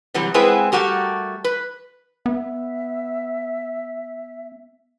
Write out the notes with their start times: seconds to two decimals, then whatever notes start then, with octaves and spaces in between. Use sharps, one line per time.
0.14 C3 E3 F#3 G3
0.34 G#3 B3 C4 E4 G#4 B4
0.72 G3 A3 F#4 G4 A#4
1.44 B4
2.26 B3 E5